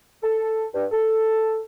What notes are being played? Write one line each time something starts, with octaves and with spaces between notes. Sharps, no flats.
A4
G2
A4